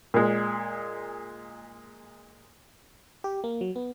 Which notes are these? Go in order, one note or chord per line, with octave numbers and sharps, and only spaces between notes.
A#2 G#3
G4
A#3
F#3
B3